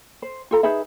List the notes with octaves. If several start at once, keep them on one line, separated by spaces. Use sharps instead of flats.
C5
F4 A4 A#5
D#4 G#4 B4 E5